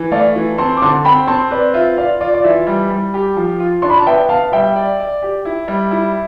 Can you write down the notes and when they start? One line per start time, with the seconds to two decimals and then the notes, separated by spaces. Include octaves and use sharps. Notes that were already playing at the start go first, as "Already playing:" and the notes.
Already playing: E3
0.11 A3 D5 F5
0.36 E3
0.58 C4 A5 C6
0.77 D6
0.82 D3 A5 C6
1.05 C4 G5 B5
1.27 C4 A5 C6
1.51 B4 D5
1.74 F4 E5
1.97 F4 D5 F5
2.21 F4 D5
2.34 D5
2.44 E3 E5
2.67 G3
2.90 G3
3.14 G4
3.36 F3
3.60 F4
3.82 D4 C6
3.90 B5
3.98 A5
4.06 B3 E5 G5
4.29 B3 F5 A5
4.52 G3 E5 G5
4.76 D5
5.00 D5
5.22 G4
5.45 E4
5.68 G3
5.91 E4